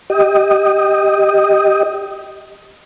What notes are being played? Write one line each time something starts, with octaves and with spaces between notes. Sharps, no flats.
G4 D#5